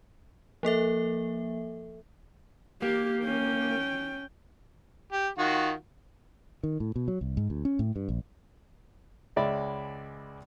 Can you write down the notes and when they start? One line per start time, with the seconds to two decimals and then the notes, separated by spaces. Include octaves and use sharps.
0.63 F3 A#3 A4 E5
2.82 A#3 G4
3.24 C#4 G5
5.12 G4
5.38 D#3 F4 F#4
6.63 D#3
6.80 A2
6.96 B2
7.08 F#3
7.21 C2
7.37 G#2
7.50 D2
7.65 C#4
7.79 A2
7.96 G2
8.09 A#1
9.36 C#2 G#3 D5 E5 B5